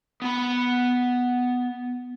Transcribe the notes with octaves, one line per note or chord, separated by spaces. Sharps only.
B3 B5